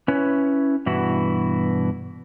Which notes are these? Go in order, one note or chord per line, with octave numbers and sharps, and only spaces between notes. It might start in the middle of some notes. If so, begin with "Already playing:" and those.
C#4 E4 B4 C#5
G2 B2 E3 E4 F#4